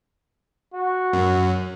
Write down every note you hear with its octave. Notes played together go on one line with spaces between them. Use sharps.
F#4
F#2